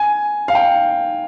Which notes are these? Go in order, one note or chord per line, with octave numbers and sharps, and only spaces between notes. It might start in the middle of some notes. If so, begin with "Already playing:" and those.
Already playing: G#5
F5
G5